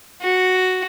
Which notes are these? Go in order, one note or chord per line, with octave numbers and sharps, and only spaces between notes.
F#4